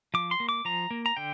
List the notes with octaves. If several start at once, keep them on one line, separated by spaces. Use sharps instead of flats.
F3 D6
C6
A#3
D6
F3 A#5
A#3
A#5
D3 G5